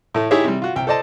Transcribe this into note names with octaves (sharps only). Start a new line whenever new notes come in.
A2 A3
D#4 E4 G4 G#4 C#5 E5
C3 G3
F4 F#4
C2 G5
A4 C5 D5 D#5 A5